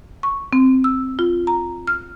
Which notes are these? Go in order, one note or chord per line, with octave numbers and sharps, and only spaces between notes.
C#6
C4
E6
F4
A#5
F6